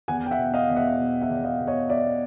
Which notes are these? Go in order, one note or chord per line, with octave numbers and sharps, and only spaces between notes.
E2 F#5 G#5
G5
E5 F#5
B2
D#5 F5
E2
E5 F#5
B2
E5 F#5
E2
D#5 F5
B2
C#5 D#5
B2 D5 E5